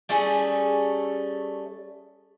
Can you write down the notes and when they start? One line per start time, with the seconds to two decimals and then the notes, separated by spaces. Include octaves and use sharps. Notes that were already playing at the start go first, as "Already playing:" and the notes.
0.09 G3 A3 C#4 G#4